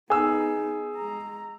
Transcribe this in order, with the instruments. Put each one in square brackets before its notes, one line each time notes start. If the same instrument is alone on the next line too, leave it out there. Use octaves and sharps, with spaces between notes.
[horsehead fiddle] B3 D#4 [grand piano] G#4 E6
[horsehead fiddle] G#3 A#5